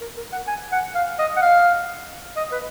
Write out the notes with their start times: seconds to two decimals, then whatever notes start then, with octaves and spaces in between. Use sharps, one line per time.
0.01 A#4
0.17 A#4
0.32 F#5
0.47 G#5
0.72 F#5
0.94 F5
1.19 D#5
1.36 F#5
1.42 F5
2.36 D#5
2.52 B4